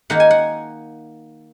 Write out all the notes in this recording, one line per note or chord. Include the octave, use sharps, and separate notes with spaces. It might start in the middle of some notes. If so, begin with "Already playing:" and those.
D#3 A#3 D#4 F#5
G#5
F#5